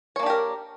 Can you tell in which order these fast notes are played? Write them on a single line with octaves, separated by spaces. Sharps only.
C#5 A#3 D4 G4 A#4